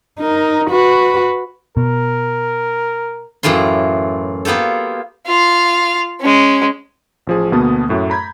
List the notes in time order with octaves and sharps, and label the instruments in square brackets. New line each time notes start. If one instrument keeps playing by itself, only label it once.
[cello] D#4 A#4
F#4 B4
[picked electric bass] B2 [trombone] A#4
[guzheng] F#2 A2 E3 F4 C6
A#3 B3 F4 G4 A4
[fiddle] F4 F5
G#3 C#4
[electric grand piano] A1 F3 G#4
D2 B2 A#3 B3 A5 D#6
F#2 A2 A3
A#5 B5 G6 G#6